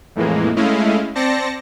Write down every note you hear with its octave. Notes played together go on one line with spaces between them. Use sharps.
F2 A2 E3 G#3 A#3
G#3 A3 C#4 E4 D#5 F5
C4 C5 D5 A5 A#6 C#7